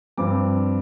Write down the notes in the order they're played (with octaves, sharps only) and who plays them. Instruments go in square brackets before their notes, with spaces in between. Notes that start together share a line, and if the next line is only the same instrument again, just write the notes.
[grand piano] G2 F3 C4 D6